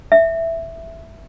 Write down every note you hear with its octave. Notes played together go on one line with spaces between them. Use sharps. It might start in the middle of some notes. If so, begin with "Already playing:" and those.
E5